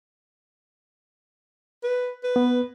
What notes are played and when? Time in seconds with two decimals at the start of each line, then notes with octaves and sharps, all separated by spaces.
1.83 B4
2.24 B4
2.36 B3